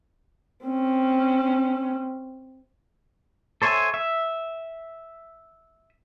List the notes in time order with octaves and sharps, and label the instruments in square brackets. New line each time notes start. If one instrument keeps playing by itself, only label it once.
[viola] C4 C#4
[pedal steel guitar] A4 C5 C#5 E5 G#5
E5